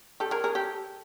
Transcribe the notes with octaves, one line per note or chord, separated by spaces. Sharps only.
G4 A4
G#4 A#4
G#4 A#4
G4 A4